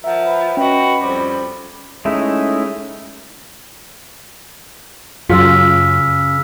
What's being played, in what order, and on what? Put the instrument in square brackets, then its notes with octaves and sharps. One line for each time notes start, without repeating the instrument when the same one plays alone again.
[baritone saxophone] F3 [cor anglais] A#4 [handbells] E5 F#5
[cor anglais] B4
[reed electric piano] C#4 [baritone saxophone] F#4 [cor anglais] B4 [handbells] D#5 G5
[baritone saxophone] F2 [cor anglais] G3 [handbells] C5 B5
[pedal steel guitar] G#3 A3 C#4 D#4 E4
[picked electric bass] F#2 F#3 [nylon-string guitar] C#3 [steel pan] F4 [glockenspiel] E6 F6 B6